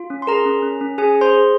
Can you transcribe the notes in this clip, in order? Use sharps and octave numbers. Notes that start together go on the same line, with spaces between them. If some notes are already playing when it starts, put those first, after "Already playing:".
Already playing: F4
C#4
C6
G#4 A#4 A#5
C#4
C#4
C#4
C#4 G#4 G#5
G#4
C5 C6
G#4